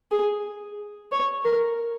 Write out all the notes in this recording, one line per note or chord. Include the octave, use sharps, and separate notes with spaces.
G#4
C#5
A#4